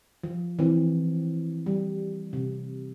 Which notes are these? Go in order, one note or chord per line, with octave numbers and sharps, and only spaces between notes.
F3
E3 C4
G3
C3